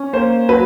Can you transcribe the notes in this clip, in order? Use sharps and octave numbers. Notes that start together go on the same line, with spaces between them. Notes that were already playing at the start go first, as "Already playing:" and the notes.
Already playing: C#4
A#3 C5
F#3 B4